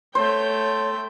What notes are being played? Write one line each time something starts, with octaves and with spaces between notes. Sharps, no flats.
A3 C5 C#5 G5